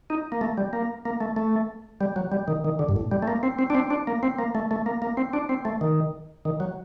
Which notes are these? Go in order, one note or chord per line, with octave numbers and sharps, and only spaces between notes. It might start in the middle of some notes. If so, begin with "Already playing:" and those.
D#4
A#3
A3
G3
A#3
A#3
A3
A3
G3
F#3
G3
D#3
D#3
D3
G2
A2
G3
A3
A#3
C4
C4
D4
C4
D4
A#3
C4
A#3
A3
A3
A#3
A#3
C4
D4
C4
A3
D#3
D#3
F#3